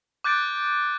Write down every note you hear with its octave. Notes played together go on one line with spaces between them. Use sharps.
D6 F#6 G6 A6 D7